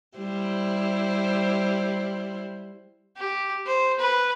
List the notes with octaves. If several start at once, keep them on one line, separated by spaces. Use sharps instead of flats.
G3 E4 C5
G4
C5
B4